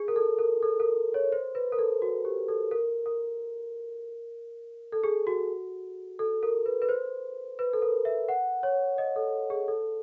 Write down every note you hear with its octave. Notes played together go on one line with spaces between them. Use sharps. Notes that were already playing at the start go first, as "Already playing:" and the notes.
Already playing: G#4
A#4
A4
A#4
A4
A#4
C#5
C5
B4
A#4
A4
F#4
G4
A4
A#4
A#4
A4
G#4
F#4
A4
A#4
B4
B4
C5
B4
A4
A#4
E5
F#5
C#5
D#5
A4
G#4
A4